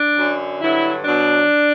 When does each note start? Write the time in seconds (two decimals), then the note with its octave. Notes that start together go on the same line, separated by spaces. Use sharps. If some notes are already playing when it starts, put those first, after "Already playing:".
Already playing: D4
0.16 F#2 D3 F#3
0.60 G2 D3 F#3 E4
1.04 B2 F#3 D4